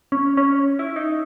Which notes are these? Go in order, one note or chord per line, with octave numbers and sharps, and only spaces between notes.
C#4
C#4
E4
D#4